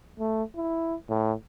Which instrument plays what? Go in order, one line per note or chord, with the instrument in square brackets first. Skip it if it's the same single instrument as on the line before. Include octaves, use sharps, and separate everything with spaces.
[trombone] A3
E4
A2